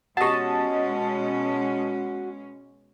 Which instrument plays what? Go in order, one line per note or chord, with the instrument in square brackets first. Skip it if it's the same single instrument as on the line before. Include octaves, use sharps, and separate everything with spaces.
[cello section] B2 G#3 C#4 [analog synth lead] F#4 [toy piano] G4 F#5 [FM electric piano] D#5 A5